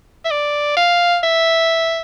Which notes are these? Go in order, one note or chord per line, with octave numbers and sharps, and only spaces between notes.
E5
D5
F5
E5